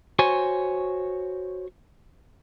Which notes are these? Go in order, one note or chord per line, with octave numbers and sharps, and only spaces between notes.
F#4 C5 C#5 G#5